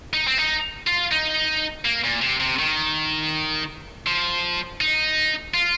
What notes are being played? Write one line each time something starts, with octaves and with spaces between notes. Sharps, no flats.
D#4
C4
D#4
F4
D#4
A#3
A#2
C3
C3
D#3
F3
D#4
F4